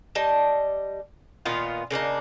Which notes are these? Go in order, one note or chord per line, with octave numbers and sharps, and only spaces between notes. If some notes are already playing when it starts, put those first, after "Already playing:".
G3 D#5 A5
A#2 D#3 B3 F4
C#3 A#3 D4 D#4